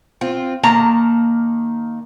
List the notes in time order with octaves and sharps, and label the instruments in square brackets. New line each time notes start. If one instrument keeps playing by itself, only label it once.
[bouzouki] C4 F4
[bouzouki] D#3 A#3 A5 [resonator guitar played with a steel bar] A#5